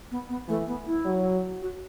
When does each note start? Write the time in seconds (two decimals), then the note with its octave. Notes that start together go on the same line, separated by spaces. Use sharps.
0.11 B3
0.29 B3
0.48 E3 A3
0.67 B3
0.86 E4
1.05 F#3
1.62 F#4